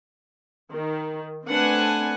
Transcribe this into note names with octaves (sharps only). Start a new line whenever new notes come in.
D#3
A3 C4 D4 B4 F#5 G#5